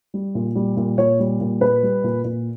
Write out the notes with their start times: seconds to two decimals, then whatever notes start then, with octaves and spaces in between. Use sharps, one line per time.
0.14 G3
0.35 A#2
0.55 G3
0.77 A#2
0.97 A#2 C#5
1.20 G3
1.41 A#2
1.61 A#2 B4
1.83 G3
2.04 A#2
2.24 A#2